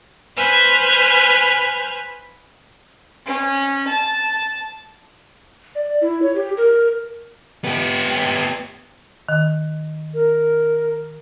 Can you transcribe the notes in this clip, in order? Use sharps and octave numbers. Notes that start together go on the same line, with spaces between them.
B4 C5 G#5 F6
C#4
A5
D5
E4
C#5
G4
A#4
B3 G4
D#3
A#4